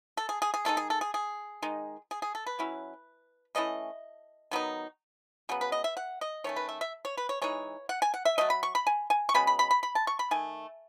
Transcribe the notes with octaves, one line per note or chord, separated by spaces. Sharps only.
A4
G#4
G#4
G#4
D#3 G#3 D#4 A4
G#4
A4
G#4
G#4
D#3 G#3 D#4
G#4
G#4
A4
B4
F#3 C#4 E4
E3 A3 C#4 E4 D#5
D#3 F#3 B3 D#4
C#3 F#3 B3
B4
D#5
E5
F#5
D#5
D#3 A3 C#4 C#5
B4
E5
E5
C#5
B4
C#5
E3 G#3 D#4 C#5
F#5
G#5
F#5
E5
F#3 A3 D#4 D#5
B5
C#6
B5
G#5
G#5
C#6
B2 G#3 C#4 B5
B5
B5
B5
B5
A5
C#6
B5
D#3 A3 G#5